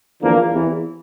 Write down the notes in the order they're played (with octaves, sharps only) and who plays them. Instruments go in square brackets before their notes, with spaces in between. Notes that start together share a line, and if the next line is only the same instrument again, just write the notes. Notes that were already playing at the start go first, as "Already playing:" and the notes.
[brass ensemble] E2 D3 F3 A#3
E2 C3 E3